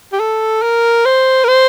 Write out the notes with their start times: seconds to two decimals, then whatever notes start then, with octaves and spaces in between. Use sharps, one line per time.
0.12 G4
0.20 A4
0.62 A#4
1.05 C5
1.44 A#4
1.48 C5